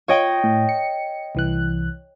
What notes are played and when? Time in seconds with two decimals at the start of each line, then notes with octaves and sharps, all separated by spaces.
0.08 F4 C#5 D#5 G5
0.44 A2
0.69 C#7
1.35 C2 E3 F#6